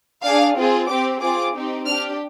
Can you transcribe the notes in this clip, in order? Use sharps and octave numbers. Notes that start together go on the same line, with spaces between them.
D4 G#4 F5
C4 F4 G#4
C4 G4 D6
C4 F4 G#4 D6
C4 D#4 G4
D4 G4 F6